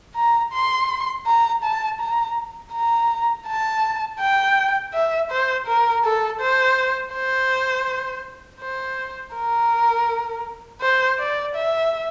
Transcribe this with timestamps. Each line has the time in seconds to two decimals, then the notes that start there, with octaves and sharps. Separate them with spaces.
0.15 A#5
0.53 C6
1.26 A#5
1.63 A5
2.00 A#5
2.73 A#5
3.47 A5
4.20 G5
4.94 E5
5.30 C5
5.66 A#4
6.04 A4
6.40 C5
7.14 C5
8.61 C5
9.34 A#4
10.81 C5
11.19 D5
11.55 E5